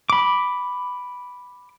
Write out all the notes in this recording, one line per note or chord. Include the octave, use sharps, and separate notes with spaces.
B5 D6